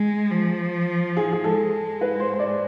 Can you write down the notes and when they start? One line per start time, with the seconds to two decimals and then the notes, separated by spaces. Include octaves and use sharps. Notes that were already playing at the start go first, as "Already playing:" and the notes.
Already playing: G#3
0.31 F3
1.17 G#4
1.33 G#4
1.44 G#3 A4
2.01 B4
2.20 C5
2.33 C5
2.39 D5